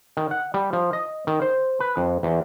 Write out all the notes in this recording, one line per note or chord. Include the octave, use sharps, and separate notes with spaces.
D#3
F#5
G3
F3
D#5
D#3
C5
B4
F2
E2